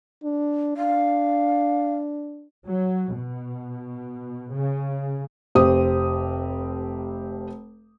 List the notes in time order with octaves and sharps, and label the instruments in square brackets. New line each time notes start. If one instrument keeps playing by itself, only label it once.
[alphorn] D4
[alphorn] D4 [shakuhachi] F5
[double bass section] F#3
B2
C#3
[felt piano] F1 C4 G4 D#6